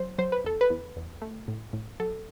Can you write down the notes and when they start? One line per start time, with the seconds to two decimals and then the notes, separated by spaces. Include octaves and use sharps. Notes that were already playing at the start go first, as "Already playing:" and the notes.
Already playing: F#3 C5
0.18 F#3 C5
0.32 B4
0.44 E2 A4
0.61 B4
0.70 E2
0.96 E2
1.22 A3
1.48 A2
1.73 A2
2.00 F#3 A4